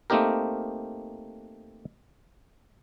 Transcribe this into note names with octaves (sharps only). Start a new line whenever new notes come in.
A3 A#3 C4 D#4 G4 A#4